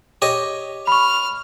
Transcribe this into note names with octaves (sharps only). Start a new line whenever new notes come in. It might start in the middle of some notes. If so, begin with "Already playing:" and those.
G4 C#5 D#5
B5 C#6 F6